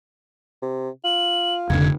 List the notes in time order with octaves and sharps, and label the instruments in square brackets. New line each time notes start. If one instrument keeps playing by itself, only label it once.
[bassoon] C3
[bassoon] F4 [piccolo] F#7
[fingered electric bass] F1 [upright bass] D3 D#3 [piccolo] G#6